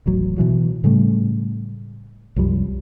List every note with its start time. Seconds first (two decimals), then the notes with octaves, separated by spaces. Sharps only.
0.06 D#1 A1 F#3
0.38 B2 E3 F#3
0.84 A2 C#3 G3 A3
2.36 C2 F#2 F3 G3